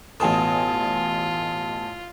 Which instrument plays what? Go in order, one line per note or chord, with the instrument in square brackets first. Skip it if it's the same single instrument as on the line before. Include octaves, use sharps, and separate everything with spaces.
[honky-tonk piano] A1 G#5 D#6 [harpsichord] B2 A4 [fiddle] F4 [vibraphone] A5